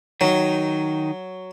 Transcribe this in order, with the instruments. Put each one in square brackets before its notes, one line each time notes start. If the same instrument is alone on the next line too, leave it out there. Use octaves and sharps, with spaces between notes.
[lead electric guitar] D#3 D#4 [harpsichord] F#3